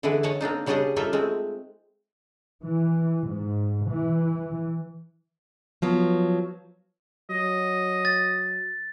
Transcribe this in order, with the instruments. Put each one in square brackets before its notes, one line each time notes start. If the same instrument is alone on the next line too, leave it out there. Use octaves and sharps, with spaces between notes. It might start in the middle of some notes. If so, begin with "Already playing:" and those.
[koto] D3 E3 G#3 E4 B4
C#5 D#5 F#5 G#5 A5
A#3 C4 D4 D#4
C#3 G3 C#4 D4 G#4 D#5
G3 A#3 D#4 F4 A4 E5
G#3 A3 C4
[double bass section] E3
G#2
E3
[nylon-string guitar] F3 F#3 B3
[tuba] F#3 [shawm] D#5
[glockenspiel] A6